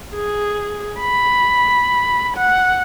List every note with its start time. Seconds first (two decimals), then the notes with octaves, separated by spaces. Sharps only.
0.14 G#4
1.00 B5
2.37 F#5